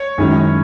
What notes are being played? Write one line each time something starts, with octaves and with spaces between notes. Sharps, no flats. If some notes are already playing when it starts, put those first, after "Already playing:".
Already playing: C#5
F#2 D#3 G#3 C#4 E4